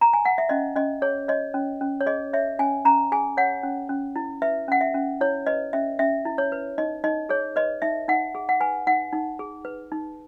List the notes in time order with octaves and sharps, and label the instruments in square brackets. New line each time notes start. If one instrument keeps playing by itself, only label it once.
[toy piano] A#5
G#5
F#5
E5
C#4 D#5
C#4 D#5
G#4 C#5
C#5 D#5
C#4
C#4
C#5
G#4 D#5
C#5 E5
C#4 G#5
C#4 A#5
G#4 G#5
C#5 F#5
C#4
C#4
E4
B4 E5
C#4 F#5
E5
C#4
E4 C#5
B4 D#5
C#4 E5
C#4 E5
E4
C#5
B4
D#4 D#5
D#4 D#5
G#4 C#5
B4 D#5
D#4 E5
D#4 F#5
G#4
F#5
B4 G#5
D#4 F#5
D#4
G#4
B4
D#4